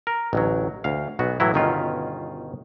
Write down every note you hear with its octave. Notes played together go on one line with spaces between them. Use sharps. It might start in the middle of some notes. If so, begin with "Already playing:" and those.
A#4
A1 D2 F#3
D2 F5
B1 B3 F#4
A2 E3 F#3 E4
G1 B2 D#3 C#4 F4